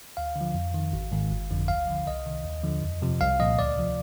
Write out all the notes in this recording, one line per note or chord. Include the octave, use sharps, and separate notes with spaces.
D2 F5
D3
F3
F2
D#3
G#1
G#2 D#3
G1
F2 D3 F3
D2 F5
D3 F3
C2 D#5
C3 D#3
D#2
D3 F3
F2
C3 F3
C2 F5
A#2 F3 D#5
D2 D5
C3 F3